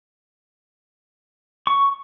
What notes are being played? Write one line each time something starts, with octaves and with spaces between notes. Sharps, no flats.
C#6